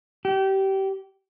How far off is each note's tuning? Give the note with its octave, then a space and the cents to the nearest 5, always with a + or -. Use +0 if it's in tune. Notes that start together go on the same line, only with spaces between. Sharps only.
G4 -25